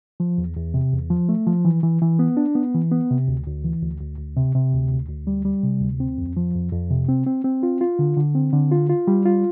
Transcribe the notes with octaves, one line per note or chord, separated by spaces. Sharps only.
F3
E2
E2
C3
E2
F3
A3
F3
E3
E3
E3
B3
D4
B3
E3
B3
C3
D2
D2
E3
D2
D2
D2
C3
C3
D2
D2
D2
G3
G3
C3
D2
C4
F2
F3
F2
F2
C3
C4
C4
C4
F4
F4
D3
D3
C4
D3
F4
F4
G3
F4